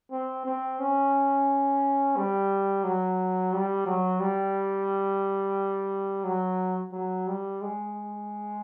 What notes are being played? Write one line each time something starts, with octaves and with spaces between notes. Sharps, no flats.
C4
C4
C#4
G3
F#3
G3
F#3
G3
F#3
F#3
G3
G#3